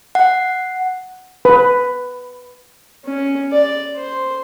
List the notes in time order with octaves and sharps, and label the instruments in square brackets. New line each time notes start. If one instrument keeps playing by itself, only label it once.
[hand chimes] F#5
[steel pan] B4
[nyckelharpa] C#4
D5
C5